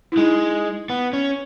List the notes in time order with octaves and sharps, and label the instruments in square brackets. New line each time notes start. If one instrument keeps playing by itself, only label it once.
[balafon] E4
[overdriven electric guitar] G#3 [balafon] D#4
[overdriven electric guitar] B3
C#4